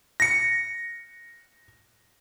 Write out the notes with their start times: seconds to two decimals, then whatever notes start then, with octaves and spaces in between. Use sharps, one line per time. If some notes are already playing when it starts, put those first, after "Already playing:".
0.20 A#6 C#7